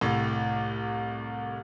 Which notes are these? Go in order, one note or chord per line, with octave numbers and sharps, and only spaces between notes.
C2 A2